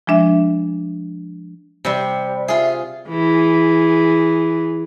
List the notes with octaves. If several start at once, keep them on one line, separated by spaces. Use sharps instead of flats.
F3 G#3 D4 E5
C3 G3
F4 G#4 E5
E3 G#4